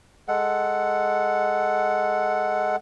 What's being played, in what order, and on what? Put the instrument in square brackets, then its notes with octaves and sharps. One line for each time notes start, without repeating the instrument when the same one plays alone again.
[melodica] G#3 A4 F#5